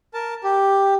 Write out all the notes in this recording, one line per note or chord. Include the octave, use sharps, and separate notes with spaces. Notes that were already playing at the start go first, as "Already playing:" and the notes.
A#4 A5
G4